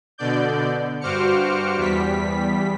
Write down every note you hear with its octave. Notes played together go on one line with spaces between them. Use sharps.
B2 D3 D5 G6
G2 F#4 C5 D6 F6 C#7
E2 G3 B6